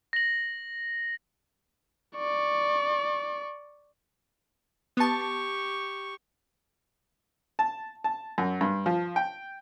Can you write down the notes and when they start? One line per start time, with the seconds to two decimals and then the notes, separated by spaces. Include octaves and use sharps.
0.13 A#6 F#7
2.16 D5 C#6
4.97 B3 G4 A5 C#6
7.59 A5
8.04 A5
8.38 F#2
8.61 G2
8.86 F3
9.16 G5